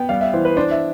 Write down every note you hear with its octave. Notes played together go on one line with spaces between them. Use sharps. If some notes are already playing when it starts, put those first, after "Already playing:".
Already playing: B3 G5
G3 F5
E5
E3 C5
B4
D4 C5
E5